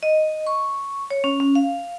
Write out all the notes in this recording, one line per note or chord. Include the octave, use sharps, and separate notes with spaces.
D#5
C#6
C#5
C#4
C#4
F5